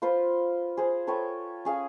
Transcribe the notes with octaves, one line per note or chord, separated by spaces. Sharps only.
F4 B4 C5
G#4 C5
A4 B4 C#5 G5
C#4 G#4 F5